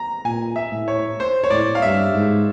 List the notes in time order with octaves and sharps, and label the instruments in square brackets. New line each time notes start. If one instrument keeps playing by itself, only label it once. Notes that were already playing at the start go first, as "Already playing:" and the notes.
Already playing: [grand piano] A#5
[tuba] A#2 [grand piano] G#5
[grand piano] E5
[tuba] A2
[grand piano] C#5
C5
C#5
[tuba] A2 [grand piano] D5
[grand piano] F5
[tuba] G2 [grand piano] E5
[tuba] G#2